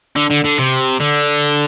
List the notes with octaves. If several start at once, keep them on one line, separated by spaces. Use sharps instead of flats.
D3
D3
D3
C3
D3